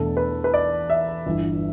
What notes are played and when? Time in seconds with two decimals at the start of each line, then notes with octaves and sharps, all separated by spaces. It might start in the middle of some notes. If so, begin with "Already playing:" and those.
Already playing: E2 B2 A3 D4 A4
0.17 B4
0.44 B4
0.54 D5
0.90 E5
1.26 G1 G2 E3